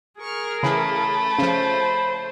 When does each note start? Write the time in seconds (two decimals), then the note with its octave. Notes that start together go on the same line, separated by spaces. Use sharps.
0.20 G#4 A#4 C#6 F6
0.63 C#3 E3 A3 B5
1.38 C#3 F3 C5